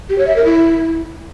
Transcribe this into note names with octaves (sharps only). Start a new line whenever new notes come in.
G4
C#5
E5
A#4
E4